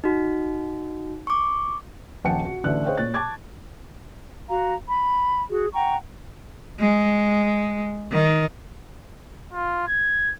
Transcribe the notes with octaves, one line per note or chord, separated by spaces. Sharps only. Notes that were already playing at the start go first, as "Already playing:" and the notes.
D#4 F#4
C#6 D6
D#1 A#1 F#5 G5 A5 C#7
F#4
A1 D3 D4 E5 F#6
G#4 C5 C#5 D#5 F5 G5
A#2 C#5 F#6 A6
A5 C#6 D6 G#6 A6
F#4 F5 A#5
B5
F#4 G#4
F#5 G5 A#5 C#6
G#3
D#3
F4
G#6